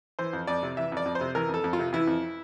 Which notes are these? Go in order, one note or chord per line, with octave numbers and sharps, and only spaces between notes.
E3 C5
F2
F2 D5
C3
E3 E5
F2
D5
F2
C5
C3
E3 A#4
F2 A4
F2
F4
C3
E3 E4
F2